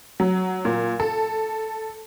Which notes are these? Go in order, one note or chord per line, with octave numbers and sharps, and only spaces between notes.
F#3
A#2
A4